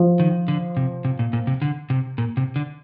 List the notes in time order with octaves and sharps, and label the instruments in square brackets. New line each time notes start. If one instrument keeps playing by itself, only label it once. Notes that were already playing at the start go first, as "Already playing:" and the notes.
Already playing: [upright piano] F3
[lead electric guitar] D#3
D3
C3
C3
A#2
A#2
C3
D3
C3
A#2
C3
D3